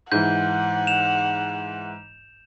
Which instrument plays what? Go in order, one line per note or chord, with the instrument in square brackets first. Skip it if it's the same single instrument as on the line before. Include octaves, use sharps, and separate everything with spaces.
[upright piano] G#2 E3 [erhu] F#5 [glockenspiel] G6
[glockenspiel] E7 F7